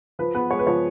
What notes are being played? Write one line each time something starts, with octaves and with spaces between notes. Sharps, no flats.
F3 B4
B3 B4
G#3 C#5
B4
F3 C#5